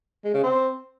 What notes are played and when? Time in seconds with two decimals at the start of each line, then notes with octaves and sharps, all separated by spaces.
0.24 G#3
0.34 C#3
0.43 C4